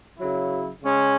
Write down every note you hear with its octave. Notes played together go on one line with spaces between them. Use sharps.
C#3 F#3 E4
C#3 G#3 C#4